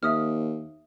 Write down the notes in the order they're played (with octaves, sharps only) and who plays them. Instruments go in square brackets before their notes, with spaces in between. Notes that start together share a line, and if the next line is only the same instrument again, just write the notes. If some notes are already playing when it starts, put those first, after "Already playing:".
[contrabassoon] D#2 [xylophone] E5 D#6 F6